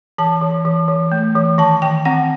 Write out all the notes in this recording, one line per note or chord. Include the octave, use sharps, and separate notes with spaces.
E3 A5
E3
E3
E3
A3
E3
D#3 A5
D#3 G5
C4 F#5